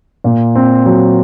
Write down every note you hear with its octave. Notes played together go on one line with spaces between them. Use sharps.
A#2
C4
F#3